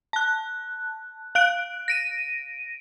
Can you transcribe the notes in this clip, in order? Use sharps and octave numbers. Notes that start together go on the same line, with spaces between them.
A5 F#6
F5 F#6 D7
A#6 D7 D#7